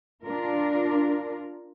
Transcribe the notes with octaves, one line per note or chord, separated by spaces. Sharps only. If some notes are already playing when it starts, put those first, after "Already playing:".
D4 F4 A#4